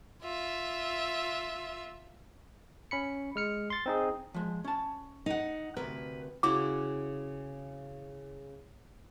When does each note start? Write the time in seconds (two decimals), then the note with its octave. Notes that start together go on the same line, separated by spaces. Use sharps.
0.22 F4 E5
2.91 C#4 B5 C#7
3.36 G#3 F6 C#7
3.70 C6 A6
3.86 C4 D#4 G#4
4.34 F3 G#3
4.64 C#4 A5
5.26 D#4 F#5
5.77 D2 C3 A#4 B4
6.43 C#3 E4 F#4 D6